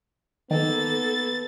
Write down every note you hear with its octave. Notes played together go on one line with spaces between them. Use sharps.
D#3 A#3 B3 A4 A6